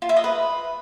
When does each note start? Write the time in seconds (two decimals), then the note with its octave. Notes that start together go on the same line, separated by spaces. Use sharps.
0.02 F4
0.09 E5
0.17 D#5
0.24 B4